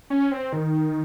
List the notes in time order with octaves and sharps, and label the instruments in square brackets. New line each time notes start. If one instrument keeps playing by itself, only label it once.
[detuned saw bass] C#4
C4
D#3